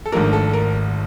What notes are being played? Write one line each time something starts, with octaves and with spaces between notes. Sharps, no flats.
A4
G#1 G#2 F3 A3 D4 A#4
A4
A#4